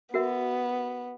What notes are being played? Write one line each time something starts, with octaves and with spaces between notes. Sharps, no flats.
B3 F#4 A#4 E5